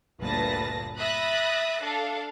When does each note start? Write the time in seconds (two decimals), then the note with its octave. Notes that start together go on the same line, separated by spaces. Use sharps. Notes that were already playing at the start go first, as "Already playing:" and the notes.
0.20 G1 D2 A#2 B4 A5 A#6
0.97 E5 B5 D#6 F#6 A6 A#6
1.82 D4 A4 F5